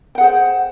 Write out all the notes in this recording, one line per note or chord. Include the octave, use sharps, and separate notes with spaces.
G#4 C5 F#5 G5